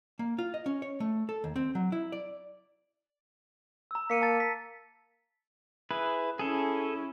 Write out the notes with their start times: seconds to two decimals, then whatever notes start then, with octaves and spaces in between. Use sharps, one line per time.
0.19 A#3
0.38 F4
0.54 D#5
0.66 C#4
0.82 C#5
1.00 A3
1.29 A4
1.44 D#2
1.56 C4
1.75 F#3
1.92 E4
2.12 D5
3.91 A#5 E6
4.10 A#3 B6 C#7 D#7
4.22 A5 A#5 A6
4.40 B6
5.91 E4 G#4 B4
6.39 C#4 E4 G#4 A4